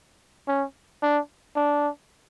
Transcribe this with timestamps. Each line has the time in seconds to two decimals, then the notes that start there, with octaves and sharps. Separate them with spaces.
0.48 C#4
1.03 D4
1.56 D4